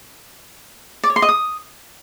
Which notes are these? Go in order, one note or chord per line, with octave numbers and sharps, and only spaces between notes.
D5
C#5
C6
D#5
D#6